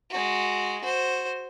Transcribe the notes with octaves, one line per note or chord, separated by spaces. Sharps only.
G#3 F#4
F#4 C5